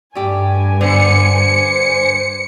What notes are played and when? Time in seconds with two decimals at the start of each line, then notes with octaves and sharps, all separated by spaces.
0.15 G2 G3 A3 G4 G#5
0.81 D3 B3 C5 C#7